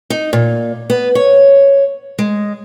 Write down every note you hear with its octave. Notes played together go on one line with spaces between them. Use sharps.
D#4
A#2
B3
C#5
G#3